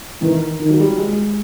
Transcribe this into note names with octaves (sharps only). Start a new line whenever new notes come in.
D#3 E3
D#3 F3
F#3
G3
G#3